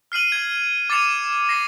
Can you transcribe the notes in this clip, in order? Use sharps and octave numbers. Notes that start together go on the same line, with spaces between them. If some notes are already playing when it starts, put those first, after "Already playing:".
F6 C7 D#7 F#7
G#6
D6 A6 C7 C#7 D#7 F7
A#6 C7